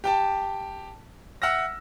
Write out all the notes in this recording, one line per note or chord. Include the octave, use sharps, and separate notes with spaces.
G4 G5 A5
E5 F#5 E6 F6 A#6